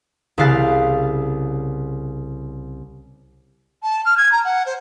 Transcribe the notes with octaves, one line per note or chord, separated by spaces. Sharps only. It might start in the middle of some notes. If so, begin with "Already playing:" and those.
C2 C#3 E4 F5 F#6 A6
A5
F6
G#6
A#5
F#5
C5